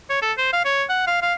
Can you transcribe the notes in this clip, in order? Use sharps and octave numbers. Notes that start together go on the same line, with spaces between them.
C#5
A4
C5
F5
C#5
F#5
F5
F5